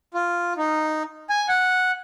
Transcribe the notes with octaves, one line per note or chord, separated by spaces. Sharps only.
F4
D#4
G#5
F#5